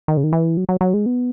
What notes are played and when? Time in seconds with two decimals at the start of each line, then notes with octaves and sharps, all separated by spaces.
0.08 D#3
0.17 C#3
0.24 D#3
0.33 E3
0.57 F#3
0.69 F#3
0.81 F#3
0.94 G#3
1.06 B3